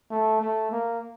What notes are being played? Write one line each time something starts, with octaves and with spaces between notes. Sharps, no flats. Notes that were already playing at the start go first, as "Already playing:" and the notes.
A3
A3
A#3